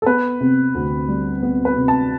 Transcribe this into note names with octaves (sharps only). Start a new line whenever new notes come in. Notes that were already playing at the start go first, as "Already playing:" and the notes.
A4
B3 B4
C3
D2
G3
B3
B4
C3
A5